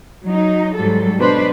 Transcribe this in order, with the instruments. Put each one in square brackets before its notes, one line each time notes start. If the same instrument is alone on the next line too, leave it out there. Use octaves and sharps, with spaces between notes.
[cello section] F#3 D#4
G#2 F#3 G3 A4
B2 F#3 D4 B4 C5